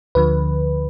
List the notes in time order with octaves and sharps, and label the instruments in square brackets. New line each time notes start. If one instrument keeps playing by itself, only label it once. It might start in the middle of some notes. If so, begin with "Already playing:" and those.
[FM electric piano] D2 D3 F3 B4